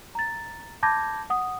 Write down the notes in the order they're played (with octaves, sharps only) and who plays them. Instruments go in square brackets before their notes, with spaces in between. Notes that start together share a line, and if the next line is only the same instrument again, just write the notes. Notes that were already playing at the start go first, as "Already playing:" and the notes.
[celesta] A#5 A6
A5 B5 D6 G6 G#6 A#6
F#5 D#6